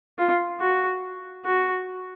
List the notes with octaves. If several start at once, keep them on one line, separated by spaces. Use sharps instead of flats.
F4
F#4
F#4